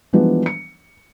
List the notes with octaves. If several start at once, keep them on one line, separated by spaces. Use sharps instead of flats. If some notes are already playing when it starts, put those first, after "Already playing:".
E3 F3 G3 G#3 B3 D4
C#7